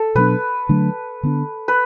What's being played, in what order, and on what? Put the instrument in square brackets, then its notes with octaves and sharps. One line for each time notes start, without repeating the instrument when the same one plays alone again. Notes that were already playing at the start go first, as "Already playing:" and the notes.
Already playing: [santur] A4
[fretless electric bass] B2 F#3 B3 D4 [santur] B4
[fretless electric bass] D3 F#3 A3 D4
D3 B3 D4
[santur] B4